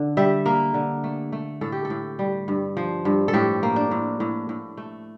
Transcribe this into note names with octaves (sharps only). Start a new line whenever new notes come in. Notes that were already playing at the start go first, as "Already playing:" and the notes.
Already playing: D3
G3 E5
A#3 A#4
D3
A3
A3
A2 A4
G4
A4
A2
G3
G2
F3
G2
A4
A2 G4
A#3
D4
A2
A2
A2
A3